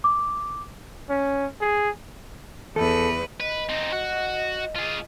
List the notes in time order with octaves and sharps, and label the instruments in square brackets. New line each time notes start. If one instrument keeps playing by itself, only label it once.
[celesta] D6
[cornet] C#4
G#4
[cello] E2 B4 [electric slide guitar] A4
[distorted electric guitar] B4 [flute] D#5
[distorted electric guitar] C4 D#4
F#4
F4 G#4